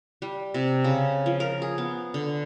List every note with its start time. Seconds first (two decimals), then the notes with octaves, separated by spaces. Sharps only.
0.22 G3
0.54 C3
0.84 C#3
1.26 F3
1.40 A#4
1.62 G#4
1.78 B3
2.14 D3